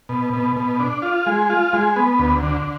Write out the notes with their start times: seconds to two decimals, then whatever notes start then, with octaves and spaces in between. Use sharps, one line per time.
0.09 B2
0.33 B2
0.56 B2
0.80 D4
1.02 F4
1.26 G#3
1.50 F4
1.73 G#3
1.96 B3
2.19 D2
2.43 D3